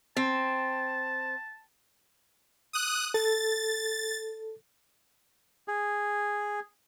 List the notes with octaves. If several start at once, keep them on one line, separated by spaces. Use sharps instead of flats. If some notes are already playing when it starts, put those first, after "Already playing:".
C4 A5
D#6 F#6
A4 A6
G#4